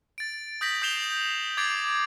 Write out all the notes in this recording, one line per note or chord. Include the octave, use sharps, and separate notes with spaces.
A6 D7
D#6 G6 A#6 B6 F#7
D#6 G6 C7 E7 F7 G7
D6 G#6 A6 C7 D7